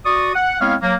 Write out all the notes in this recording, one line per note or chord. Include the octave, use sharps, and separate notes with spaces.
F#4 D5 C#6 D#6
F#5
G#3 B3 C4 E4 C#5 F5
F#3 A#3